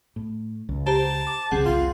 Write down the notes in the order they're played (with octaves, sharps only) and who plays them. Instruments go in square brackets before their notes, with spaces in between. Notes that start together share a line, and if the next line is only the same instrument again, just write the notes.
[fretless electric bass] A2
C#2
[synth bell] G4 C5 A#5 [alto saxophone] A5
[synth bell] D6
[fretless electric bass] D1 C2 C#3 [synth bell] C4 G#4 F#5
[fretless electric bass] F1 C2 [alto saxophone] F4